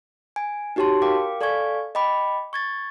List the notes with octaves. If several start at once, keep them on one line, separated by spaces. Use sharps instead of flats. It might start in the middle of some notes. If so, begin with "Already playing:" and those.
G#5
D#4 F#4 G4 C#5 A5 C6
A#4 F5 G5 D6
A4 D5 F5 G#5 C#6 G#6
D#5 G5 B5 D6
C#6 G#6 A6